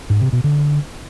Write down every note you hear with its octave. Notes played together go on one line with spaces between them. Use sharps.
G#2
C3
B2
D3